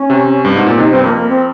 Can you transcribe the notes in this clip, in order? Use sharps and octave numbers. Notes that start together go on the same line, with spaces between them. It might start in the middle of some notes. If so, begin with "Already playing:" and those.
Already playing: C#4
C3
G2
G#2
A#2
C3 D#4
G2 C4
F2 A#3
A#3
C4